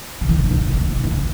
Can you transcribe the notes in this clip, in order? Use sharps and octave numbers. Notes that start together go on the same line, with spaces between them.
C#3
D#3
C#3
D#3
C#3
D#3
C#3
D#3
C#3
D#3
C#3
D#3
C#3